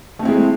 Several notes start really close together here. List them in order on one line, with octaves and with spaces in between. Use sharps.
A3 C4 E4 G#3